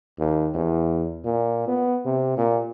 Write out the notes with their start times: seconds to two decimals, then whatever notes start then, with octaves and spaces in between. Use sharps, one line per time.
0.19 D#2
0.54 E2
1.25 A#2
1.68 B3
2.05 C3
2.37 A#2